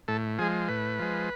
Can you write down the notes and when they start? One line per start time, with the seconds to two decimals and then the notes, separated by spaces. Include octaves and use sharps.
0.08 A2 A4
0.38 F3 G#3 G#4
0.69 A2 B4
0.99 F3 G#3